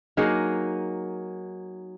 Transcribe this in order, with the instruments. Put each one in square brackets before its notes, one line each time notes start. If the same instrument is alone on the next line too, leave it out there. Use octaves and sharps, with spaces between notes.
[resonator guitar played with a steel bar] F#3 A#3 D#4 G#4